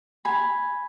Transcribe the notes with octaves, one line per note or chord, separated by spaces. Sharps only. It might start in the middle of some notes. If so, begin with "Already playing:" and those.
G#5 B5